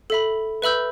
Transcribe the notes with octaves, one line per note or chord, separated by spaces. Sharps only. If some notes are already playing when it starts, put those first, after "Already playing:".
A4 E5 B5
B4 E5 B5 E6 G6